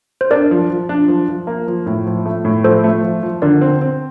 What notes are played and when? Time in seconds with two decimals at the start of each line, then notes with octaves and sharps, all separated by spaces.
0.21 C5
0.31 D4 A#4 D5
0.51 F3
0.70 F3
0.89 D4
1.08 F3
1.28 F3
1.47 A#3
1.68 F3
1.86 A2
2.07 F3
2.26 A3
2.45 A2
2.64 F3 A4 C5
2.84 A3
3.03 F3
3.23 F3
3.42 D3 A#4 D5
3.61 C4
3.81 C4